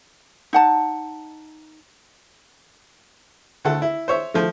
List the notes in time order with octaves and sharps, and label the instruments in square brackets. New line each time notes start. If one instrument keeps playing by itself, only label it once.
[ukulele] D#4 F#5 A5
[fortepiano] D2 A3 A4 F#5
E4
C5 C#5 E5
F3 A3